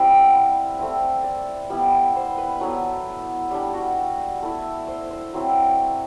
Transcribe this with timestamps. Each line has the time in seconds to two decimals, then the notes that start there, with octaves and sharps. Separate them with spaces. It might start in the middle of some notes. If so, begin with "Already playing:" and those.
Already playing: G3 C4 E4 E5
0.11 F#5
0.79 A3 C4 E4
1.24 D5
1.70 G3 B3 E4
2.16 C5
2.38 B4
2.61 F#3 B3 E4 A4
3.51 G3 D4 G4
3.74 F#4
4.42 A3 E4
4.87 C5
5.10 C5
5.34 F#3 C4 E4